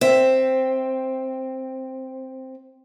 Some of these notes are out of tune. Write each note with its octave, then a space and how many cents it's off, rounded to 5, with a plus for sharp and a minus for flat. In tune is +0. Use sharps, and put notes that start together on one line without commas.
C4 +0 E5 +0